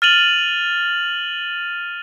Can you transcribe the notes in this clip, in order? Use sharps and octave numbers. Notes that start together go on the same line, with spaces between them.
F6 A6 D#7 F7 F#7